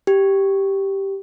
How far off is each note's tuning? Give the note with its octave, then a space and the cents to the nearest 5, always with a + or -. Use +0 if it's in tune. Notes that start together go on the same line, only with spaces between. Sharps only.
G4 -5